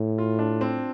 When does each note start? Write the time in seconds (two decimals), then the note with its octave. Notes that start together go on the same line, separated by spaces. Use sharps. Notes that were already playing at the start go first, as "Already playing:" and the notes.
Already playing: A2
0.18 F4
0.39 D4
0.61 C4